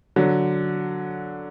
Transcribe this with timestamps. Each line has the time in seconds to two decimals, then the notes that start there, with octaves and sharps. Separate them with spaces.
0.16 D3 F#3